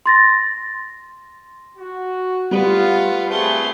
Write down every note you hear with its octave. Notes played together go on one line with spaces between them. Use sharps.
C6 A6 A#6
F#4
G3 A3 B3 F4
A3 C4 G#4 B4 C6